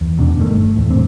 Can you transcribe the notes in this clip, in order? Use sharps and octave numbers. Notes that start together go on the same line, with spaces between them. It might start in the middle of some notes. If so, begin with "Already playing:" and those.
E2
D2 B2 C4 D4
G1 D#3 A3
A3
E2 A2
E1 C2 C4 D4